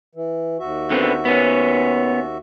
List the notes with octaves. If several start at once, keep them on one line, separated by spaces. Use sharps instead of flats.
E3
D#2 F#4 E5
D3 B3 C4
B3 C#4